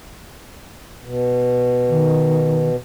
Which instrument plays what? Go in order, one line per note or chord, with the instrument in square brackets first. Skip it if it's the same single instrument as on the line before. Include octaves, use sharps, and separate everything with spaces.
[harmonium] B2
[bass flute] D#3